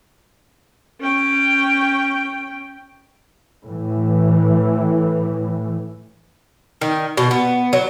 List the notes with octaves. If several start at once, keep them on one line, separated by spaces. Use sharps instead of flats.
C#4 G5
A2 E3
D#3
B2
B3
F#3